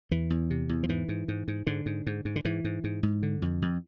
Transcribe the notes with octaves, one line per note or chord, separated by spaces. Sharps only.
E2 E3
E2
C3
E2
F3
G#2 E3
G#2
G#2
G#2
G#2 D3
G#2
G#2
G#2
D3
G#2 E3
G#2
G#2
G#2
D3
F2
F2